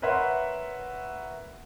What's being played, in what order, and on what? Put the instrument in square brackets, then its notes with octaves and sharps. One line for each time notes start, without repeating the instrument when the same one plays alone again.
[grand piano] A#4 B4 C#5 E5 F#5 C6